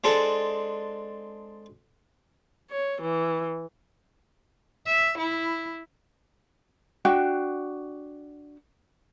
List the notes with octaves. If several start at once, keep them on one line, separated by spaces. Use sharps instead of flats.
G#3 C4 D4 A4
C#5
E3
E5
E4
D4 F#4 G5